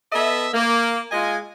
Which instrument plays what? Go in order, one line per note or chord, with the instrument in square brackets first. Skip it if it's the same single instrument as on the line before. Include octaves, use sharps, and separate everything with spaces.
[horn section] B3 A4 D#5 E5
A#3
G#3 F4 D#5 G#5